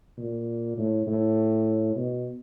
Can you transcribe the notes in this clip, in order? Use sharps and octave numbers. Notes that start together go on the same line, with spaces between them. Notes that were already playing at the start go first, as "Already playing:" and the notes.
A#2
A2
A2
B2